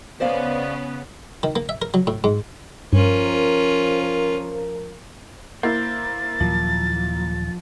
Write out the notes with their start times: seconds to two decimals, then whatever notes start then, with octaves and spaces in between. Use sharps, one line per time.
0.20 C#3 B3 C#4 C5 D5 F5
1.43 D#3
1.56 A#3
1.69 E5
1.82 A#4
1.94 F#3
2.07 A2
2.24 G#2
2.93 G2 F3 C#4 F4 A#4
5.63 A#3 E4 C5 A6
6.41 D#2 A#2 F3 F#3